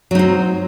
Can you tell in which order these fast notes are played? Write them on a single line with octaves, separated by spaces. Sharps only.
F#3 D#4 C4